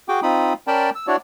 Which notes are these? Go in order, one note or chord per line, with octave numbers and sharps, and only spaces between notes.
F#4 G#4 G5 D6
C4 D#4 F4 B5 D#6
C#4 A#4 D5 G5 A5 B5
E6
D4 E4 F#4 C#5 D5